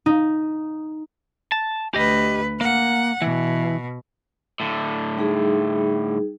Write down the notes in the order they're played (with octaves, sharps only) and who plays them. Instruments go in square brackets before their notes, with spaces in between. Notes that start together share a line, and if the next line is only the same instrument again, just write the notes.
[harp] D#4
[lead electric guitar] A5
[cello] D2 B4 [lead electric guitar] G4 D#5
[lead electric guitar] A#3 [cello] F#5
[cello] B2 [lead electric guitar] E3
[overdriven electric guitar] A2 D3
[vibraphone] G3 D#4 G#4